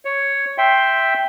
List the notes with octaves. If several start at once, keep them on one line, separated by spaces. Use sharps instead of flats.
C#5
E5 G5 C6